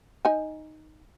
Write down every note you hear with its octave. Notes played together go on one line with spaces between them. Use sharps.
D#4 G#5